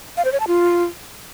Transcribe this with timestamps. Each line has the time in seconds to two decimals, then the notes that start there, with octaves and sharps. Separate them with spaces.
0.17 F5
0.25 C5
0.32 C#5
0.40 A5
0.48 F4